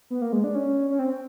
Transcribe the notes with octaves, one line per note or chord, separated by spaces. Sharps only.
B3
A#3
G#3
D4
C#4
C#4
C4